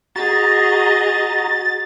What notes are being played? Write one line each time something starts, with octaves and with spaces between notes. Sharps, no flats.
F#4 G#4 D#5 A#5 A6